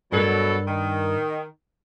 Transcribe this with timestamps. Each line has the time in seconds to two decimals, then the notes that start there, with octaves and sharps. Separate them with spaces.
0.12 G2 B2 F#3 A4 A#4
0.68 D#3